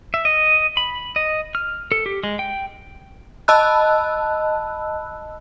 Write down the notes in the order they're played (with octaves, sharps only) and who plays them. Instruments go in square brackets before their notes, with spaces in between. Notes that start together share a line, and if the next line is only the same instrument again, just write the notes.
[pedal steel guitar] E5
D#5
B5
D#5
F6
A4
G4
G#3
G5
[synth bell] D#5 A5 B5 E6 F#6